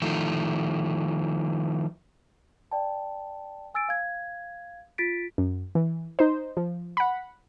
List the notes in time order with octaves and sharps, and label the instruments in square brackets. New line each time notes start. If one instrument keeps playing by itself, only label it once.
[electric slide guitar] D#3 F3 A3
[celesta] D5 G5 A5
G#5 E6 A6 D7
F5 G#6
F4 A6 B6 D7
[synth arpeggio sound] F#2
E3
D#4 C5
F3
F#5 B5